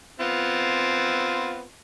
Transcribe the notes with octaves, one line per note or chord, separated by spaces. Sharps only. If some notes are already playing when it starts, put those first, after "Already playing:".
B3 C4 F4